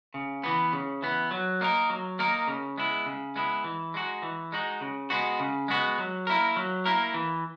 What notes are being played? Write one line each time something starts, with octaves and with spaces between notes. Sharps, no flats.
C#3
E3 B3
C#3
E3 B3
F#3
A#3 D#4 A#4
F#3
A#3 D#4 A#4
C#3
G#3 B3 E4
C#3
G#3 B3 E4
E3
G#3 D#4 F#4
E3
G#3 D#4 F#4
C#3
G#3 B3 F#4
C#3
G#3 B3 F#4
F#3
A#3 E4 A#4
F#3
A#3 E4 A#4
E3